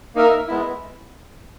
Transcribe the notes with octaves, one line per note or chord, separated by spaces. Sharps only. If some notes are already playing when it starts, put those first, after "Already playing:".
A#3 D#4 A#4 E5
G#3 B3 E4